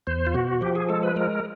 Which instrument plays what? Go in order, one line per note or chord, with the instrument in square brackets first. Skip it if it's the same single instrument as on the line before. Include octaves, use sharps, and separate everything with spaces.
[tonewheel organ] E2 C5
F4
B2 F#4
F3 G4
G#4
G#3 A4
B4
G#3 A#4